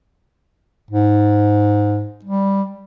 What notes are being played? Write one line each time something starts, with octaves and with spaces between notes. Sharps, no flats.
G#2
G3